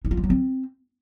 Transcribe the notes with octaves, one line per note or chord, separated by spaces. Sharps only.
D#4
F4
F3
F#3
C4